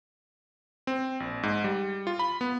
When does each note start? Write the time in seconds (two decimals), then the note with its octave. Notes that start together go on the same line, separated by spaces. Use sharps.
0.87 C4
1.20 A#1
1.43 G#2
1.64 G3
2.07 F4
2.19 B5
2.41 B3